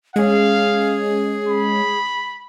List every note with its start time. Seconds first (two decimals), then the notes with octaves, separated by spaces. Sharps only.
0.16 G#3 C#4 G#4 F5
1.48 B5